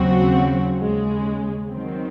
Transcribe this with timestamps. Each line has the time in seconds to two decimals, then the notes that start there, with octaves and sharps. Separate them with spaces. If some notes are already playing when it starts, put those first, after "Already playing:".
Already playing: D#2 C#3 F#3 C4 F#4
0.80 D#2 C#3 G#3
1.68 D#3 F#3 C4